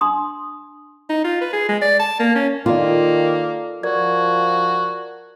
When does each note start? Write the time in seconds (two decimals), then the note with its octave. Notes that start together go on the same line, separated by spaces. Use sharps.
0.01 D4 A#5 C6 D#6
1.10 D#4
1.24 F4
1.41 B4
1.53 G#4
1.69 G#3
1.82 D5
2.00 A5
2.20 A#3
2.35 C#4
2.66 D#3 A#3 F4 A4 D5
3.83 F3 F#4 A#4 D5 G#6